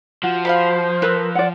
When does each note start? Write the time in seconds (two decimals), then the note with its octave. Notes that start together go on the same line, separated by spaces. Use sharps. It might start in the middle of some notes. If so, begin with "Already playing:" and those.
0.23 F3 F#4
0.45 C5 F5 F#5 B5
1.02 C4 A#4 B4
1.35 D5 F#5